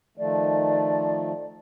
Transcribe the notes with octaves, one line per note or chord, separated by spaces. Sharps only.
D#3 F3 A3 D5